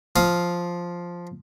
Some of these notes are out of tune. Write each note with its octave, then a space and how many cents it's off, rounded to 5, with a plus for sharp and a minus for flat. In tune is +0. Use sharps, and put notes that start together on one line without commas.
F3 +0 F5 +0 D#6 +25